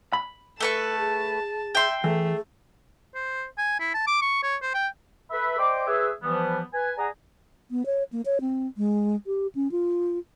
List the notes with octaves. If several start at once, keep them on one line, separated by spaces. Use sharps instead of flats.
B5
A3 A4 B4 A5 C#6
G#4
E5 G5 C6
E3 A3 G#4
C5
G#5
E4
A5
D6
C#6
C#5
C5
G5
A4 B4 E5 B5
C5 D5 D#5 G5 C6 D6
G#4 B4 C#5 E5
E3 F3 G3 B3
B4 G#5
G#4 D5 F#5 G#5 A#5
B3
C#5
A#3
C#5
C4
G#3
G4
C#4
F4